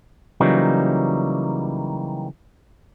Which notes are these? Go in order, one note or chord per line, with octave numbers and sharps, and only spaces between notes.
C#3 E3 F#3 G3 A#3 D#4